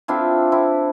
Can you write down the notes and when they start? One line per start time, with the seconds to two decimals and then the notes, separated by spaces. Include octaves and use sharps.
0.08 C4 D4 E4 F4
0.52 C4 E4